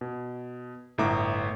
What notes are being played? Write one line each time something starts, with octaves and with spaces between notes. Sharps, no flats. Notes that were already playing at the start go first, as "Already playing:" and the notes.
B2
G1 A2 E5 A#5 D6